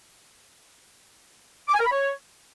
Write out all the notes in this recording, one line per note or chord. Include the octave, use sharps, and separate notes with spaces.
D6
G#5
A#4
B5
C#5